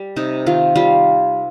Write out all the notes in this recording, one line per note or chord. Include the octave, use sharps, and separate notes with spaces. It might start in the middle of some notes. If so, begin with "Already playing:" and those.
Already playing: G3
C3 D#4
D#3 F4
G3 F4